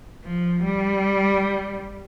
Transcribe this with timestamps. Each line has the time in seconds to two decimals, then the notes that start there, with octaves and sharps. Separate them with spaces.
0.25 F3
0.65 G3